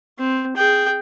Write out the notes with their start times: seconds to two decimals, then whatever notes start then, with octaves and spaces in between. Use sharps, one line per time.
0.19 C4
0.56 G#4 G5